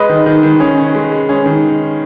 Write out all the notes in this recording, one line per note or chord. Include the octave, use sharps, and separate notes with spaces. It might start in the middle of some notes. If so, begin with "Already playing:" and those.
Already playing: G#3 B4 D#5
D#3
D#3
D#3
C#4
C#4
G#3
G#3
C#4
D#3